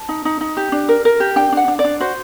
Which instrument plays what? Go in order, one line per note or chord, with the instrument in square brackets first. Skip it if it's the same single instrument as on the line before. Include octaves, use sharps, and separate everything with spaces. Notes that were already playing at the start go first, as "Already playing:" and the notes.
Already playing: [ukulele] A5
D#4
D#4
D#4
G4
D4
A#4
A#4
G4
D4 G5
D4 F#5
D4
D5
D4
F#4 C5